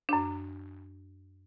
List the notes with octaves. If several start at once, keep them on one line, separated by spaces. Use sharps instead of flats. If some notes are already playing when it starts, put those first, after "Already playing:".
F#2 D4